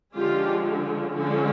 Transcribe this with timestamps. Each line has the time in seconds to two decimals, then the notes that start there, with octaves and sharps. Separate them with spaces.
0.16 D3 F3 G#3 C#4 F4 G4
1.14 D3 F3 G#3 C#4